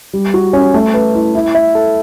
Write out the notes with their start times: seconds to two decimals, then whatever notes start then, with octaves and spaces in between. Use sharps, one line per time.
0.13 G3
0.34 F#4
0.53 C#4
0.74 A3
0.94 B4
1.15 E4
1.35 E4
1.55 E5
1.75 A4